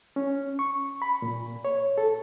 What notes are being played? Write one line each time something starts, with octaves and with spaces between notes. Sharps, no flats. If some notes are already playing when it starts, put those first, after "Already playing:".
C#4
C#6
B5
A#2
C#5
A4